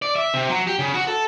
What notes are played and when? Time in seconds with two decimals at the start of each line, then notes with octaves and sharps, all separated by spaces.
0.02 D5
0.16 E5
0.34 C3
0.49 F#3
0.67 G4
0.79 C#3
0.94 F#4
1.07 A4